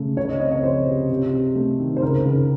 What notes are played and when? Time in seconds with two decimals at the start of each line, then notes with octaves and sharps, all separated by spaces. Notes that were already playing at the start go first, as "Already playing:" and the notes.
Already playing: C#3 A3
0.17 C#2 C#5
0.29 D#5
0.40 C4 D#5
0.51 C#5
0.63 F3 C5
0.86 C3
1.10 C3
1.33 C3
1.55 A3
1.80 D#3
1.96 C5
2.02 C#2 A#4
2.25 C#2